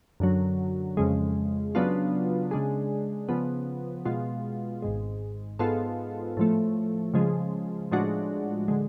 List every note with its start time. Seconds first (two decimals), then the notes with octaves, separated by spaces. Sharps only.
0.20 F#2 D3 F#3
0.97 F2 C#3 G#3
1.75 C#3 F#3 B3 D4 F4
2.51 C#3 G#3 D4 G#4
3.29 C#3 F3 B3
4.05 B2 G#3 B3 F4
4.82 G#1 G#2 G#3
5.59 G#2 G#3 B3 F4 A4
6.37 A2 F3 A3
7.14 C#3 F3 G#3
7.91 A2 F3 G#3 D4 F#4
8.68 D3 G#3